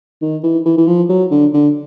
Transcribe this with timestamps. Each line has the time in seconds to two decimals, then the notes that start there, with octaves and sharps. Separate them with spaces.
0.22 D#3
0.44 E3
0.66 E3
0.78 E3
0.87 F3
1.09 F#3
1.31 D3
1.54 D3